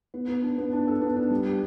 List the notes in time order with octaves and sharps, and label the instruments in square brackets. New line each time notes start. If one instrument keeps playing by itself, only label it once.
[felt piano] B3
B3
D4
B3
D4
A4
B3
D4
G3
G4